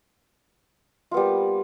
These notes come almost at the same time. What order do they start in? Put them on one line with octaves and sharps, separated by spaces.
F4 B3 G3 A#3